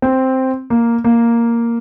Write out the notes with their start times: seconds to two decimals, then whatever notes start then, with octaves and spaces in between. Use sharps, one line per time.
0.02 C4
0.70 A#3
1.04 A#3